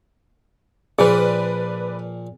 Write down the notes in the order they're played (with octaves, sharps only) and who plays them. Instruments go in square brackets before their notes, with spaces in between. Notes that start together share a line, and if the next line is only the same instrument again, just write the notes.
[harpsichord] A#2 F3 [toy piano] G#4 [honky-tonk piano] B4 D5